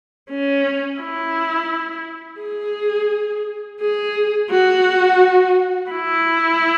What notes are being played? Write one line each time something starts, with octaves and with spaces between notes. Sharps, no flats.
C#4
E4
G#4
G#4
F#4
E4